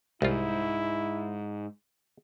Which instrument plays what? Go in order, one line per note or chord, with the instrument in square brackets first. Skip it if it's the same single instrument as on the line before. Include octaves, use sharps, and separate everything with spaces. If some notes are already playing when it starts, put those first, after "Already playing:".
[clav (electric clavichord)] C2 F4 [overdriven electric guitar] G#2 [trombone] E4